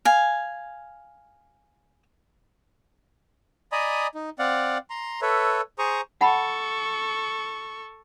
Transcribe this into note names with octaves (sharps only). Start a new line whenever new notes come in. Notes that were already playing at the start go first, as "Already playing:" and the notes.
F5 G#5
D5 D#5 G#5 A#5 B5 D#6
D#4
C4 D5 F5 F#5
A#5 C6
A4 B4 C#5 E5
G#4 C5 A#5 C#6 D#6
A4 F#5 A5 B5 C#6